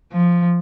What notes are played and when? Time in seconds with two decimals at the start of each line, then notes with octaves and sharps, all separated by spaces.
0.13 F3